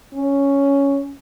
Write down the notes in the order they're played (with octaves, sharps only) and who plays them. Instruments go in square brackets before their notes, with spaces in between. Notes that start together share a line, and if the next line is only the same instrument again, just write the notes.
[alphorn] C#4